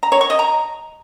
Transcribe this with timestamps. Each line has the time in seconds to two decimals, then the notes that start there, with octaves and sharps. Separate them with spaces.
0.03 A#5
0.12 C#5
0.21 C#6
0.30 D#5
0.39 A#5